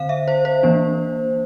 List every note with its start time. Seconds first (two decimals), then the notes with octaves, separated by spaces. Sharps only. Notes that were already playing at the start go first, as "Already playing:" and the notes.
Already playing: D3 C4 C5 F5
0.09 E5
0.28 C5
0.45 C5
0.63 E3 A#3 D4